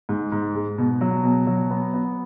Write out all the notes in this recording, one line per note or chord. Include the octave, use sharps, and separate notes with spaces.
G#2
G#2
G#3
B2
F#3
B2
F#3
B3
B3